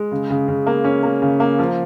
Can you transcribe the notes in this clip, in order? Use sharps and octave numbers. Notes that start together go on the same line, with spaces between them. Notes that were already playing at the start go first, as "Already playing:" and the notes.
Already playing: G#3
C#3
C#3
C#3
A#3
C#4
A#3
C#3
A#3
F3